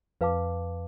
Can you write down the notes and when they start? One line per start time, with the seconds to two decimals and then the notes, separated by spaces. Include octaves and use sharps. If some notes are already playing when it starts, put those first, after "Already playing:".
0.21 F2 B4 F5 A5 D6